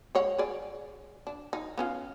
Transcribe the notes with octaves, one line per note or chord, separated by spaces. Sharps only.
G#3 C#5 F#5
G#4 D5
D4
D#4
B3 C#4 F4